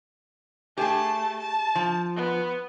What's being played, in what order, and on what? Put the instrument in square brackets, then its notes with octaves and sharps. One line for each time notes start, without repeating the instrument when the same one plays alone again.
[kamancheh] A3 A5 [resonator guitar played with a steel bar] G4 G#4
[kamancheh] A5
[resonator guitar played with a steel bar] F3
[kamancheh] B3